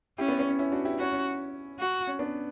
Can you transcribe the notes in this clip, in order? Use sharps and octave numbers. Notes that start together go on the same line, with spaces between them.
C#4 E4 G4
B3
B3
C#4
C#4 E4
D4 F#4
E4 G4
C#4 E4 F#4
C#4
F#4
C#4
B3 D4